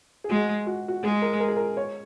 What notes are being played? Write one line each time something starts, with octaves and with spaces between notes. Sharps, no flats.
G#4
G#3 F#4
F#4
F#4
G#3 G#4
A#4
A#4
G#4
A#4
C#5